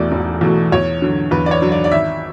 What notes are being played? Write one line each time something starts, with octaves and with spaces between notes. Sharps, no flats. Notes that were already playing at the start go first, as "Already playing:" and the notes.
Already playing: E1 E2 B2 A3 D5
E1
E2 B2 A3
E2 C#5
D3 F#3
E2 B4
D5
C#5
D3 F#3
D5
D5
G#1 E5